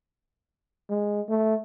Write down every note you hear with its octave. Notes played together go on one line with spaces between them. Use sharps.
G#3
A3